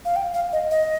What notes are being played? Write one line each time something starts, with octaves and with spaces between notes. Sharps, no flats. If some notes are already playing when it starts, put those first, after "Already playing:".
F5
G5
F5
D#5
D#5